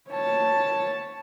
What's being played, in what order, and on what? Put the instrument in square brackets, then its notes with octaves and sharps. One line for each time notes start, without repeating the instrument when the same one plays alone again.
[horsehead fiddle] C#5 A5